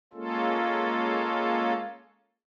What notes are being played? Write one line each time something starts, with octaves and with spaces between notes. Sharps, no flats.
G#3 A#3 C#4 F4 A4